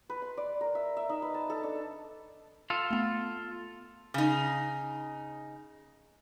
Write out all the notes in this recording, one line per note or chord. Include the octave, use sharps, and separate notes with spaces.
B4
C6
D5
A#4
E5
E5
D#4
B4
A5
A4
D4
F4 A4
A3 B3
C#3 D#4